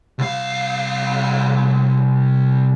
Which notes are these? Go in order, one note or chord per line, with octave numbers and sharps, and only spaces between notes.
C2 F5